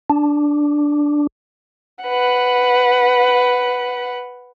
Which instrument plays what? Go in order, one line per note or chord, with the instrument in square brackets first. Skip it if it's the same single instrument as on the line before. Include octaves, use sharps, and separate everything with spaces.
[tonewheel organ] D4
[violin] B4 F#5